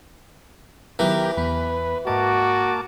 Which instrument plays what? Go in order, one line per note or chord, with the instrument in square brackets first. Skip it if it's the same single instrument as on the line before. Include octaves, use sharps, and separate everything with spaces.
[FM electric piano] D#3 F#3 B3 [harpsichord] E3 [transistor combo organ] G4 A#4
[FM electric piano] E2 B3 [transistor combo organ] B4
[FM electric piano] G#2 D#5 [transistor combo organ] A#3 A5 D6 [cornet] F#4